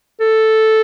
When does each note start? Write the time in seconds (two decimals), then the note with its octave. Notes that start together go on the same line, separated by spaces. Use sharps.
0.20 A4